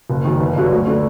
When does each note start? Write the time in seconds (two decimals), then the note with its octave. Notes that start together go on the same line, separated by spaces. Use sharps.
0.10 F#1
0.25 F#2 D#3
0.40 G1
0.55 G2 D3 F#3
0.72 D2
0.87 D3 A3